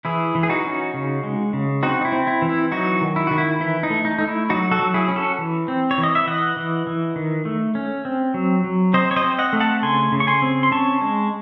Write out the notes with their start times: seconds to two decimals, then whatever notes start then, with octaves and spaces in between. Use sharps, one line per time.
0.05 E3 E4 G#4
0.35 E3
0.43 G#4
0.49 D#4 F#4
0.65 C#4
0.94 C#3
1.23 G#3
1.53 C#3
1.83 C4 D#4 F#4
2.01 D#4
2.05 E4
2.12 C4
2.27 E4
2.42 E3
2.49 E4
2.71 F#3 D#4 F#4
3.01 D#3
3.16 E4
3.27 D#3 F#4
3.38 E4
3.60 E3 E4
3.83 D#4
3.90 A3
4.05 D#4
4.18 A3 D#4
4.27 E4
4.50 F#3 D#4 F#4
4.71 F#4 A4
4.79 F#3
4.94 E4 G#4
5.08 C#4
5.16 F#4 A4
5.39 E3
5.68 C4
5.91 C#5
5.98 E3
6.03 D#5
6.15 E5
6.27 E3 D#5 F#5
6.57 E3
6.87 E3
7.16 D#3
7.45 A3
7.75 C#4
8.05 C4
8.34 F#3
8.64 F#3
8.93 C4 C5 D#5
9.11 C#5
9.16 C5 D#5
9.24 C4
9.39 D#5 F#5
9.53 A3
9.60 F#5 A5
9.82 C#3 G#5 C6
10.12 C#3
10.20 C#6
10.27 G#5 C6
10.42 C4
10.63 C6
10.72 C#4 A5 C#6
11.02 G#3